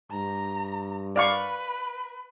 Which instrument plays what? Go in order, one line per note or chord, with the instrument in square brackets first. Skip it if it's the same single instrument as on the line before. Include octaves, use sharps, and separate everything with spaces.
[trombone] G2 [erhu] A#5
[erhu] B4 [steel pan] D5 F5 C#6